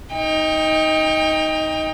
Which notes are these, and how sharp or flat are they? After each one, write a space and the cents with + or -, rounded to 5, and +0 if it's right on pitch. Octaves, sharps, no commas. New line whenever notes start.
D#4 +10 G5 +25